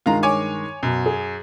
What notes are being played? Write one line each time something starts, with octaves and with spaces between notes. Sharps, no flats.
G2 D#3 G#3 F4 A#5
C#5 G#5 D6
F#2 B2
G#4